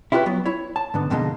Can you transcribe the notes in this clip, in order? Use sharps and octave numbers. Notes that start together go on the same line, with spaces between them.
E4 F4 G4 G#4 B4 C#5
F#3 B3
E4 C#5
A5
G#2 D3 B3
F2 B2 D3 G#3 A#3 D#4